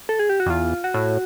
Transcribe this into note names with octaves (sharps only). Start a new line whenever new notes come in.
A4
G#4
G4
F#4
F2
E2 F4
F#4
A2